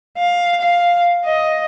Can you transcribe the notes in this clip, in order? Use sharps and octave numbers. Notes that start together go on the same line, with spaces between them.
F5
F5
D#5